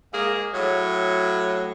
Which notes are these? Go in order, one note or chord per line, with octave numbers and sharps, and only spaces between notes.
G#2 A#3 G#4
A2 F#3